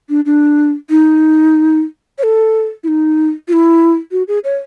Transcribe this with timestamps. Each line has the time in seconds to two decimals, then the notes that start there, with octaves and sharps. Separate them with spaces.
0.09 D4
0.26 D4
0.90 D#4
2.18 C#5
2.23 A4
2.84 E4
2.88 D#4
3.48 F4
3.53 E4
4.12 F#4
4.28 G#4
4.44 C#5